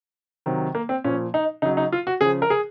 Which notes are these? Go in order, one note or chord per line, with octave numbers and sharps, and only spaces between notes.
C3 D#3 F#3
A#3
C4
A#2 F3 C#4
D#4
C#3 F#3 D#4
D#4
F4
F#4
C#3 F3 G#4
A#4
G#4